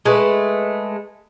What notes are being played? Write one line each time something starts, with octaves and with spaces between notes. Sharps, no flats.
G#3 A3 B4